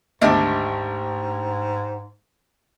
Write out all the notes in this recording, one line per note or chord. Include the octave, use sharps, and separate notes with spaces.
G#1 D2 G#2 D4 G4 D#5 E5